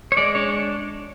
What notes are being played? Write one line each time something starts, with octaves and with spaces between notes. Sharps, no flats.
C#5
G#3 D5
D4 C#5